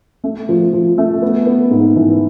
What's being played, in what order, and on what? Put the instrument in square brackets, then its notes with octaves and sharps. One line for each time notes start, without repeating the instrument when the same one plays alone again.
[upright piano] A3
F3
F3
A3
B3
B3
G#2
E3